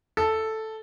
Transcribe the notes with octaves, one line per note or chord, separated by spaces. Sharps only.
A4